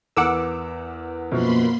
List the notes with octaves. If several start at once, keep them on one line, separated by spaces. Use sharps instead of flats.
E2 B3 A#4 F#5 D6 E6
F#2 B2 F3 A#3 B5 C6